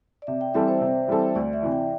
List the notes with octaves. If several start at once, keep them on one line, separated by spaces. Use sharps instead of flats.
D5
C3 E5
G5
E3 G3 C4 A4 E5
C5
C3
E3 G3 C4 A4
D2 D5
E5
C3 E3
G5